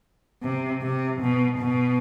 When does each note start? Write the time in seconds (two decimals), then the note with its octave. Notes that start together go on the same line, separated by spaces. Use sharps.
0.43 C3
0.82 C3
1.21 B2
1.59 B2